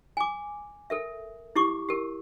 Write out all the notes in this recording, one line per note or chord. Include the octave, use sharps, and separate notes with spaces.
G#5 D6
A4 A#4 E5
E4 G4 C#6 D6
G4 A#4